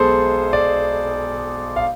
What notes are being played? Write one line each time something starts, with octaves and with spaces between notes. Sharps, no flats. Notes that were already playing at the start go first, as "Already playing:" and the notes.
Already playing: B1 B2 G#3 G#4 A4 C5
D5
F5